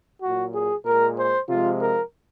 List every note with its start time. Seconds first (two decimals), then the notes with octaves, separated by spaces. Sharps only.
0.22 A#2 F#3 F#4
0.54 G#4
0.85 A#2 G#3 A#4
1.17 C5
1.48 C3 F3 G#3 F4
1.80 A#4